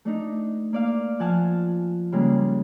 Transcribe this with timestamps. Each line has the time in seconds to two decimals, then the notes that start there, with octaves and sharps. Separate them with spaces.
0.05 A3 D4 D#4
0.73 A#3 D5 F5
1.19 F3 F#5 G#5 A5 F6
2.12 C#3 G3 G#3 A#3